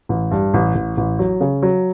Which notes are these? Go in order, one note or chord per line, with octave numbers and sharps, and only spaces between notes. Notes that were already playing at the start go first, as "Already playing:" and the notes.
A1
G2
A1
A1
A1
F#3
C#3
F#3